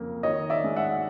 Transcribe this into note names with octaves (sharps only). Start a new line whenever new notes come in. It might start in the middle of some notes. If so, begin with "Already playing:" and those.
Already playing: F2 C#3 F#3 A#3
D#3 C#5 D#5
D5 E5
G#3
E5 F#5